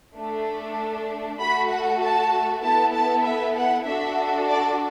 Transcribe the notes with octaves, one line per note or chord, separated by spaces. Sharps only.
A3 D4 A4
A3 F#4 A4 B5
F#5
A5
B3 E4 A4 A5
A5
E5
F#5
D4 F#4 A4 E5
D5